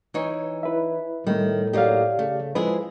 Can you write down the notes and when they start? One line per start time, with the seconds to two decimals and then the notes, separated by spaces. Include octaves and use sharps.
0.14 E3 D#4 C#5
0.63 E4 B4 E5
1.27 A2 D#3 G3 A3
1.73 F#3 A#3 D#4 G4 D5 F5
2.19 C#3 A3
2.55 F3 G#3 E4 G#4 B4